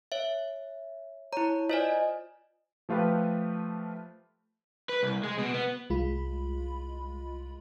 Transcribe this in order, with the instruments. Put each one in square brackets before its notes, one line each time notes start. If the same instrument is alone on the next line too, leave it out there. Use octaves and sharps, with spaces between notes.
[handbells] C#5 E5
[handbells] E4 A#5 [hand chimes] C#5
[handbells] F4 C5 D5 [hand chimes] D#5 G#5
[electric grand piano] F3 A3 F4 G4 B4
[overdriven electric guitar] B4
C2
G#3
B2
B3
[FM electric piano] C2 G#3 F4 B5